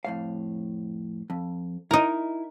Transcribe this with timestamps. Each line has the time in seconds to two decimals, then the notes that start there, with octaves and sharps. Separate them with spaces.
0.05 F2 A2 F5
1.30 F2
1.91 D#4 E4 A#4